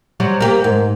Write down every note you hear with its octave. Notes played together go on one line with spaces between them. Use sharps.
F#3 G3 C5
A#3 G4 A#4
G#2